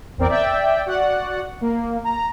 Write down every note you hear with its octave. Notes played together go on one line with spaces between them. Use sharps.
A1 E2 C4 A#4 D5
D5 E5 G5
F#4 D5 F#5
A#3
A#5